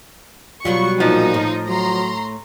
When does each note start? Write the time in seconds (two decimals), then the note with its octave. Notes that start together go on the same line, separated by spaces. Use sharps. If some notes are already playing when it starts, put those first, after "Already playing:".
0.65 B2 F#3 G3 F4 C#6
1.00 A#2 F3 D#4
1.34 A2
1.68 F#3 A#5 C6